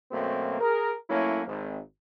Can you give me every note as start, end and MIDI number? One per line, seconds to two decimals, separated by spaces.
0.12 0.58 42
0.12 0.58 47
0.12 0.58 57
0.12 0.58 58
0.12 0.58 60
0.61 0.92 68
0.61 0.92 70
1.09 1.41 54
1.09 1.41 57
1.09 1.41 58
1.09 1.41 61
1.09 1.41 64
1.47 1.79 32